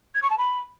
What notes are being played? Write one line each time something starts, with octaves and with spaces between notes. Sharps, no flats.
G#6
C#6
A5
B5